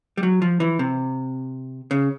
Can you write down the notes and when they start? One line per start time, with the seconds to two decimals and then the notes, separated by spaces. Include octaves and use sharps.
0.17 G3
0.23 F#3
0.42 F3
0.60 E3
0.79 C3
1.91 C#3